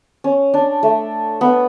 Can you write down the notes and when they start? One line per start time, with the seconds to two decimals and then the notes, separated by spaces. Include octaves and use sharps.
0.24 C#4
0.54 D4
0.83 A3
1.41 B3